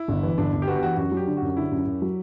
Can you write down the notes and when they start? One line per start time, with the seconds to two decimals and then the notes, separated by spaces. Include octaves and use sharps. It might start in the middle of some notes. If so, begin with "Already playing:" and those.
Already playing: E4
0.08 G1
0.23 E3
0.38 G1 D4
0.53 G1 D4
0.62 G4
0.68 B3 F#4
0.76 G4
0.83 E3 F#4
0.97 F#2 F#4
1.12 F#3
1.17 G4
1.26 D3
1.37 F#4
1.42 F#2
1.57 D3 E4
1.72 F#2
1.86 F#2
2.02 F#3